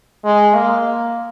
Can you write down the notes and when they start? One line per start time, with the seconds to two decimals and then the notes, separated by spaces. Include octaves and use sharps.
0.24 G#3
0.55 A#3